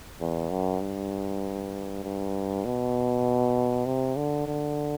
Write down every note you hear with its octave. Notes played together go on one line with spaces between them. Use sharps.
E2
F#2
G2
G2
B2
C3
D3
D3